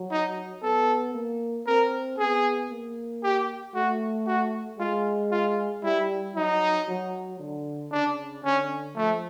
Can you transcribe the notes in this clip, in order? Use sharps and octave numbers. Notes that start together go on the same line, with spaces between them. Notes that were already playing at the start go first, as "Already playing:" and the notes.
Already playing: F#3
D#4
B3 A4
A#3
C4 A#4
B3 G#4
A#3
G4
A3 F#4
F#4
G#3 F4
F4
G3 E4
F#3 D#4
F#3
D3
C#3 D4
D3 C#4
F3 A3